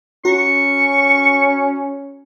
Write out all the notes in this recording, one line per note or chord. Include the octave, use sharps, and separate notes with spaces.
C#4 F#4 A#5 C#6